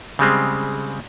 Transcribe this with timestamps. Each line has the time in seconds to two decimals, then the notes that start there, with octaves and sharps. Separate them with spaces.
0.19 C#3 G3 G#3 C4